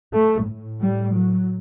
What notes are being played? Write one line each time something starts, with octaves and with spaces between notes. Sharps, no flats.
A3
A2
G3
F#3